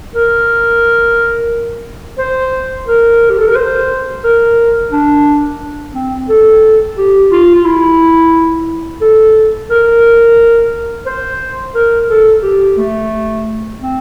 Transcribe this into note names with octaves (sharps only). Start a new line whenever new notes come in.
A#4
C5
A#4
G4
A4
A#4
C5
A#4
D4
C4
A4
G4
F4
F4
E4
A4
A#4
C5
A#4
A4
G4
A3
C4